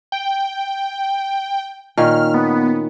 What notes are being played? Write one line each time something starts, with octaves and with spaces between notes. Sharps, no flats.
G5
A#2 D#3 C#4 F6
B3